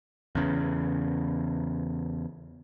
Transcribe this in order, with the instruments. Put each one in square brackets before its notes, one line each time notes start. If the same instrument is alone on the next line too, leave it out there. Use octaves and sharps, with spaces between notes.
[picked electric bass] E2 C#3